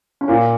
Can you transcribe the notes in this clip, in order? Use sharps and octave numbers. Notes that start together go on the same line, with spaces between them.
C#4
A#2 A#3